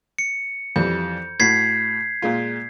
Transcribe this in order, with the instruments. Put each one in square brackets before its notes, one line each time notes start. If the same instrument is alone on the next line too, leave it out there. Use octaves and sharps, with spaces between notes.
[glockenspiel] C#7
[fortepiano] F2 E3 G3 [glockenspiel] G6
[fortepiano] A2 F#4 [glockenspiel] G#6 B6 C7
[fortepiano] A#2 G#3 F4